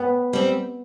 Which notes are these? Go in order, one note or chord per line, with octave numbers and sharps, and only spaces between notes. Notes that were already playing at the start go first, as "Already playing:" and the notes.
Already playing: B3
G3 C4